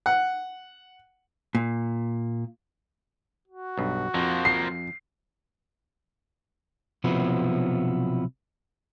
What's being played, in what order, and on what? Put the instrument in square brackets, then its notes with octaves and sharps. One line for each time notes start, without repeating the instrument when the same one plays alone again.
[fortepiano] F#5
[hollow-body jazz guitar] A#2
[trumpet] F#4
[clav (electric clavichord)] B1 G2
[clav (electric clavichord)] F2 [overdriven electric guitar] F3 A#3
[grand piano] C7
[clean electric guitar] B1 C3 F3 F#3 B3 E4